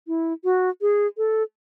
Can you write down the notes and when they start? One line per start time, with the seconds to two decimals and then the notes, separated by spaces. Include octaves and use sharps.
0.08 E4
0.44 F#4
0.82 G#4
1.18 A4